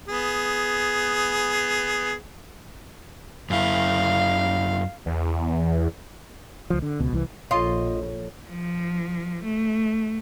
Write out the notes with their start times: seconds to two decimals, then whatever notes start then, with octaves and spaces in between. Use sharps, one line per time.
0.08 B3 G#4
3.50 F#2 E4 F5
5.06 E2
6.70 C#2 F3
6.82 D3
7.00 C#2 B2
7.13 C2 E3
7.51 A#1 F4 A4 C#5 D#5 C6
8.50 F3
9.44 A3